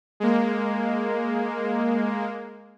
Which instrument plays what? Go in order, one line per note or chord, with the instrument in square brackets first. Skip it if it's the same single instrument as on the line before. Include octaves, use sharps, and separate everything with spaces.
[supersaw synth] G#3 A#3